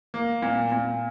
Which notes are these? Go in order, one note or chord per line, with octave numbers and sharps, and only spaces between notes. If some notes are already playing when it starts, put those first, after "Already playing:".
A#3
A#2
A#2